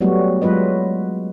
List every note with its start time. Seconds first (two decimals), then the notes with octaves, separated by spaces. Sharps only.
0.01 F#3 G3 A3 B3 F#4
0.42 F#3 G#3 F4 B4 D#5